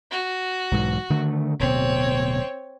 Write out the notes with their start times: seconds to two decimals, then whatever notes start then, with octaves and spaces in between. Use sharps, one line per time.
0.11 F#4
0.71 B1 G#2 E3
1.10 D3 D#3 A3
1.60 D1 B2 C4 C#5